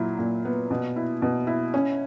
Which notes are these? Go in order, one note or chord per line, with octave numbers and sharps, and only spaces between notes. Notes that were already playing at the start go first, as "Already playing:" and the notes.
Already playing: A#2 F#3 E4
A#2
B3
B2
E4
B2
E4
C#4